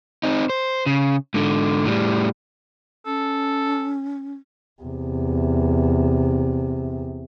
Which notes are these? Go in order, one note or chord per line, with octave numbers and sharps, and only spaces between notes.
C4 D#4
C5
C#3
G#2 D3
A2 G3
C#4 A4
E2 C3